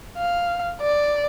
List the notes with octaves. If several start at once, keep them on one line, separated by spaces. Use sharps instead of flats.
F5
D5